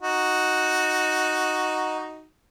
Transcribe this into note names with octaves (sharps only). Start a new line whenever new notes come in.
D#4 F#4